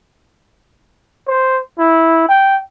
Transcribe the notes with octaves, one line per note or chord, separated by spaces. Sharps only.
C5
E4
G5